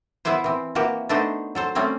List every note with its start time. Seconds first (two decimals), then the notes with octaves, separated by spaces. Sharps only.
0.25 B3 E4 G#4 B4 C5
0.44 E3 C4
0.75 E3 A#3 F#4 G4
1.09 A3 B3 D4 D#4 C5
1.55 F#3 A4 C5
1.75 G3 A3 C4 C#4